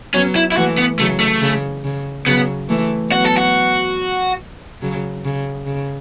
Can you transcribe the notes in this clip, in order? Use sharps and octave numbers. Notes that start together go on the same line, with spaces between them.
F#3 B3 C#4
E4
E4
E3 A3 F#4
B3
C#3 F#3 A3
A3
C#3
C#3
C#3 F#3 B3
E3 A3
F#3 B3 F#4
A4
F#4
C#3 F#3
C#3
C#3